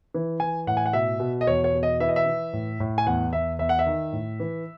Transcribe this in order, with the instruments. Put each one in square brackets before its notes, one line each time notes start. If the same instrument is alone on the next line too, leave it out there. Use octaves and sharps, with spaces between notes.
[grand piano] E3
E3 G#5
A2 F#5
G#5
F#5
B2 E5
B2
D#5
E2 C#5
C#5
B2
D#5
E3 E5
D#5
E5
E3
A2
A2
G#5
E2 F#5
E2 E5
E2 E5
F#5
E5
D#3
A2
E3